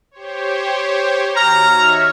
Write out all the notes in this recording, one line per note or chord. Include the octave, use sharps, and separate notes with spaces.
G4 C5 C#5
D#2 F#4 A#5 F6
D#4 C#5 E5